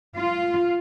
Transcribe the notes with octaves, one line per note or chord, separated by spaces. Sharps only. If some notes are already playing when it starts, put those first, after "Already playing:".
F4